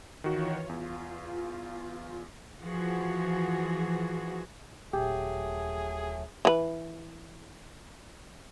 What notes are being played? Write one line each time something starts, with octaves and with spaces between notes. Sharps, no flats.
D#3 E3 F4 F#4 C#5
E2 F4
E3 F3 F#4 G#4
D#1 F#3 A3 G4 G#4
E3 B4